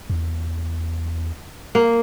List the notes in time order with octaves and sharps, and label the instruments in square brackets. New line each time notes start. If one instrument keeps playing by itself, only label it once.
[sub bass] E2
[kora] A#3